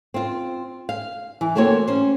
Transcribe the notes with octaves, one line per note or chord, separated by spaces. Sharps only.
C4 F4
F5
E3
A3 A#3 C4 F#4 C#5
C#4 C5